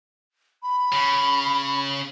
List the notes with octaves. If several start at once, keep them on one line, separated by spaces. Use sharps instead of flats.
B5
C#3